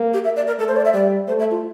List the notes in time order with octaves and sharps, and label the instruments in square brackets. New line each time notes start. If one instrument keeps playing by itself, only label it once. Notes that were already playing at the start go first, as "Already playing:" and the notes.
Already playing: [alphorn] A#3
[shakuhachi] G4
E5
D5
A#4
[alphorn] A3 [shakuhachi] A4
[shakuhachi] C5
D5
E5
[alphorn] G3 [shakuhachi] D5
[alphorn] A3 [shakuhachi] C5
[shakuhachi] E5
F4